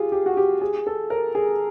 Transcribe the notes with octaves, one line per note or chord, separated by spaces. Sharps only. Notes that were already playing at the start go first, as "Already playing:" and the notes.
Already playing: F4 G4 G#4
G4
F#4
G4
G#4
A4
A#4
G#4